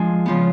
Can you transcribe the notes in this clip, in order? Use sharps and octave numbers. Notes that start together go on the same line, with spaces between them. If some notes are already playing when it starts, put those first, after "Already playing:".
Already playing: F3 G#3 D4 G#5
C#3 F3 B3